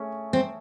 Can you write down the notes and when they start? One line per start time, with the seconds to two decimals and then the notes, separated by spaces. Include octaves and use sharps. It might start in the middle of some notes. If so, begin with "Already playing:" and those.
Already playing: A3 C#4 G#4
0.33 C4